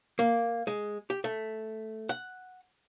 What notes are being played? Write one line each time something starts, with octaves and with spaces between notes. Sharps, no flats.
A#3
G#3
G4
A3
F#5